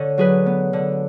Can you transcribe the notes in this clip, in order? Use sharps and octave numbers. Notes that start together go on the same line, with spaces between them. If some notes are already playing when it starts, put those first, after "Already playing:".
Already playing: D3 A4 C#5
F#3 G#4 B4
B3
D3